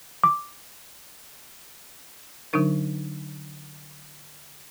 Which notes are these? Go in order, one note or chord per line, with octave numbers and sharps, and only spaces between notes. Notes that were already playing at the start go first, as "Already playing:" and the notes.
D6
D3 F#3 D4 D#4 A#4